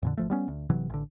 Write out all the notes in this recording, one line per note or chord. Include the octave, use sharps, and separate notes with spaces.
F2 A#2 D3
G#1 F3 A3
G3 B3 C#4
D2
G1 C3 E3 F#3
A1 D3